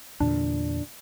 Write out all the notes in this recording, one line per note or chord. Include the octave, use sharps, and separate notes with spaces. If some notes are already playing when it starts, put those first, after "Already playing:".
E2 A#2 D3 D4